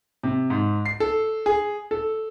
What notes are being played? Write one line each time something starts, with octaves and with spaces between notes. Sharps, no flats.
C3
G#2
C7
A4
G#4
A4